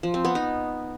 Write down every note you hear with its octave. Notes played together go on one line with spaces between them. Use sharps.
F3
C4
B3
D#4